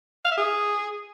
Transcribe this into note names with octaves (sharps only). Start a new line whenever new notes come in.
F5
E5
G#4